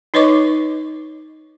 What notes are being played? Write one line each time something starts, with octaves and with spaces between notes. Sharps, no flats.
D#4 B4 C#5 D#5 C#6 D6